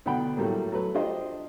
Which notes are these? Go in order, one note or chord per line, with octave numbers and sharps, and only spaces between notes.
B2 D3 D4 F#5 G5 B5
A2 F#3 G3 A3 A#3
F#3 A3 B4
D4 F4 G4 C5 D#5